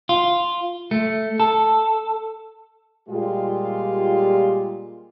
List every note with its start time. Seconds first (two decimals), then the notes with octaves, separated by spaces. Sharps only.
0.09 F4
0.91 A3
1.40 A4
3.08 A#2 G3 G#3 F4 G4